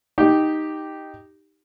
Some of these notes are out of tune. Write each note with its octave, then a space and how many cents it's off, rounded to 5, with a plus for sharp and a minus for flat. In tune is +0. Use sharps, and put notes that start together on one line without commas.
D#4 +0 G4 +0